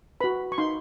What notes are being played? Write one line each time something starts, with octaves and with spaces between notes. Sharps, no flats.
F#4 B4 B5
C#6
D#4 C6